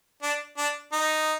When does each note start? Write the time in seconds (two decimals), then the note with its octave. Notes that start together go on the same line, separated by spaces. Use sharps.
0.23 D4
0.58 D4
0.92 D#4